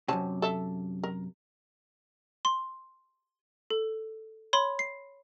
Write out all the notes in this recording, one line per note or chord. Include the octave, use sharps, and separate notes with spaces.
F#2 A2 C3 C4 C#4 A5
A4 E5
A#4
C6
A4
C#5 B5 C6
C7